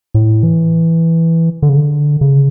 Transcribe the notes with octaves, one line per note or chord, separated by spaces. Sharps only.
A2
E3
D3
C#3
D3
C#3